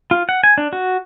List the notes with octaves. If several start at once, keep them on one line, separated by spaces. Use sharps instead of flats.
F4
F#5
G#5
D4
F#4